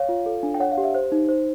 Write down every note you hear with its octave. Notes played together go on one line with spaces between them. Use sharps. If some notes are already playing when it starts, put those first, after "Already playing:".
Already playing: C#5 F5
F4
A4
D4
G5
C#5 F#5
F5
G4
E5
C5
D#4
C5